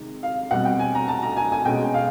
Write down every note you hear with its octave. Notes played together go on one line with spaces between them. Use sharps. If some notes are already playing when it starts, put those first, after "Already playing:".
Already playing: C3 D#3 G#3
F5
B2 G3 C4 F#5
G5
G#5
A#5
A5
A#5
G#5
G#5
B2 G#3 C#4 G5
F5